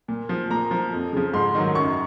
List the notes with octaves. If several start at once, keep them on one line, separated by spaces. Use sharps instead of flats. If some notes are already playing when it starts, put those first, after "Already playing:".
A#2
F3
A#2 A#5
F3
F2
C#3 F3
G#2 C6
D#3 F#3
F#2 C#6